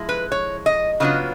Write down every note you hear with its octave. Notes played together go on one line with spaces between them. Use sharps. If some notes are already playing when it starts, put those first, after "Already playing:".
Already playing: F3 G#3 E4
B4
C#5
D#5
C#3 F#3 B3 D4 F4 D#5